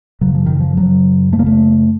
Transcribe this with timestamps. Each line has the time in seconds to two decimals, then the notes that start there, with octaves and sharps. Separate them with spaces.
0.21 F#2 C#3 F#3
0.35 F3
0.46 D#3
0.60 F3
0.77 F#2 C#3 F#3
1.32 F#2 A3
1.36 C#3 A#3
1.46 A3